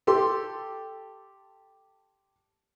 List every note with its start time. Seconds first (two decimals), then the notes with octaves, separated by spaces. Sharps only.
0.07 G4 A4 C6